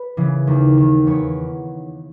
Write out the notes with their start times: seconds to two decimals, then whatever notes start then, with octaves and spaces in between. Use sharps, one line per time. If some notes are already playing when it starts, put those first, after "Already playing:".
Already playing: B4
0.17 C#3 E3
0.47 D#2
0.78 D#3
1.06 E2 C#5